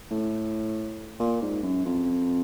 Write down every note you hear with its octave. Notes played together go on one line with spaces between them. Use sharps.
A2
A#2
G#2
F#2
F2